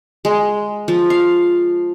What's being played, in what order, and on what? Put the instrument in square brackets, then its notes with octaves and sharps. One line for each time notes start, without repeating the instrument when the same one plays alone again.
[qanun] G#3
F3
F5